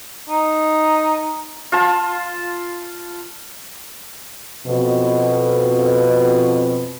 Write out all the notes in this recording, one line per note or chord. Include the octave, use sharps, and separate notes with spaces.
D#4
F4 A5
F2 B2